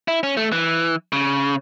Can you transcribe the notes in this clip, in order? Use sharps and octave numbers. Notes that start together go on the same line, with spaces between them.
E4
C#4
A3
E3
C#3